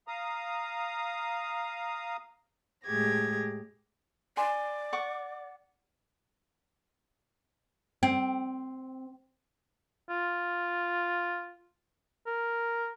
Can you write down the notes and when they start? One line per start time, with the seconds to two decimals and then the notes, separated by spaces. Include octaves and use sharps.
0.08 F5 A#5 D#6
2.86 A2 G#3 G4 G#4 G#6 A#6
4.37 D5 G#5 C6
4.93 F#5 C#6 D6
8.03 C4
10.10 F4
12.27 A#4